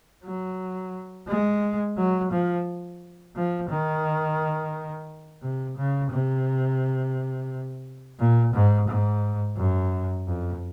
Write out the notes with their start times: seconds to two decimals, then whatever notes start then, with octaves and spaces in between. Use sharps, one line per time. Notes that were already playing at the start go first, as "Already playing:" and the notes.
0.24 F#3
1.28 G#3
1.97 F#3
2.31 F3
3.35 F3
3.69 D#3
5.42 C3
5.77 C#3
6.11 C3
8.19 A#2
8.54 G#2
8.88 G#2
9.57 F#2
10.27 F2